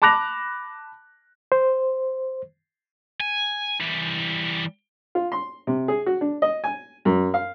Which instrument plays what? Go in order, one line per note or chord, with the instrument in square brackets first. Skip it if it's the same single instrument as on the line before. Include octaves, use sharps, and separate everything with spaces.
[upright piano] A5 B5 D6 F#6 A#6 F7
[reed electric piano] C5
[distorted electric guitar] G#5
E3 G3
[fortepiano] F4
C6
C3
G#4
F#4
D4
D#5
G#5
F#2
F5